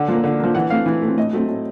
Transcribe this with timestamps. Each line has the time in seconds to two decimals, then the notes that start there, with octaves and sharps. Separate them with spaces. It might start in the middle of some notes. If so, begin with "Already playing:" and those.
Already playing: D3 F#5
0.08 F3 A#3
0.24 D3
0.40 F3 A#3
0.55 E3 F#5
0.70 A3 C4 F5
0.86 E3
1.02 A3 C4
1.17 A2 D#5
1.33 F#3 A3 C4
1.49 A2